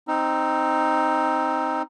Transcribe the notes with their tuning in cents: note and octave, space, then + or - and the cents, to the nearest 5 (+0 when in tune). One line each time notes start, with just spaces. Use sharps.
C4 +0 D#4 +0 E6 +30